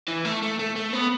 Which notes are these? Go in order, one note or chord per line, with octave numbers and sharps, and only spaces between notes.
E3
A3
A3
A3
A3
B3